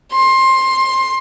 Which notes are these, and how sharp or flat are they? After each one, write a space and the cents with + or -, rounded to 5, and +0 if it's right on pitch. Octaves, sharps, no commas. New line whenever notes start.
C6 +20